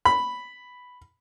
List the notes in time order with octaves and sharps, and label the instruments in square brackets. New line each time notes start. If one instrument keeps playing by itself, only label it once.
[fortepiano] B5